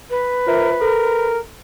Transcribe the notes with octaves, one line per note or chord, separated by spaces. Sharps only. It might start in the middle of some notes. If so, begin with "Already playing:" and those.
B4
F4 A#4 C5 E5
A4 A#4